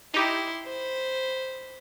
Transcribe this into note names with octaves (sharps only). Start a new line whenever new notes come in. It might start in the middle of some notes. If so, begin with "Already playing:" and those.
D#4 E4 G4 C6
C5 B5